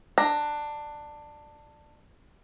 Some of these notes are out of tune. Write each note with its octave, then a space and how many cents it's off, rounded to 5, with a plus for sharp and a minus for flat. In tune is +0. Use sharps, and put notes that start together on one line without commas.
D4 +15 A#5 +0